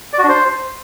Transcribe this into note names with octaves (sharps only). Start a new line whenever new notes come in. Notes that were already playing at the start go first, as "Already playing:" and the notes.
D5
F#4
D4
C5